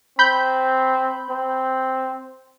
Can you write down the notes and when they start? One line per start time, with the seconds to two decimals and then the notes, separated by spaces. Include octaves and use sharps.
0.19 C4 B5 G6
1.30 C4